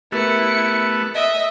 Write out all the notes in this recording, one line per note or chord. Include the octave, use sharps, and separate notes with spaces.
A3 B3 E4 G4 A#4 B4 C#7
D#5 E5